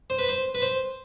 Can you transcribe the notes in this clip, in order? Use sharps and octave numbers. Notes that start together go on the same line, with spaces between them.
C5
B4
C5
B4
C5